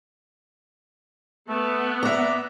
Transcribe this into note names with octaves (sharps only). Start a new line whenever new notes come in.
A3 B3
D5 E5 A#5